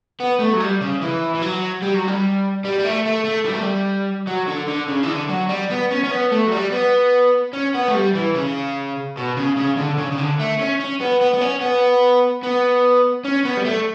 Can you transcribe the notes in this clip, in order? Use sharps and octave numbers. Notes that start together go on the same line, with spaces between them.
B3
A3
F#3
G3
C#3
E3
E3
F#3
G3
F#3
G3
G3
G3
A3
A3
A3
G3
A3
G3
F#3
D3
D3
C#3
E3
D3
F#3
G3
B3
C#4
C#4
B3
A3
F#3
G3
B3
C#4
B3
A3
G3
E3
C#3
B2
C#3
C#3
D3
C#3
C#3
D3
A3
C#4
C#4
B3
B3
B3
C#4
B3
B3
C#4
B3
G3
A3